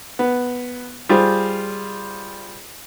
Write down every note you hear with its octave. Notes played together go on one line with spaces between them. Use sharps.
B3
G3 F4 G#4 C5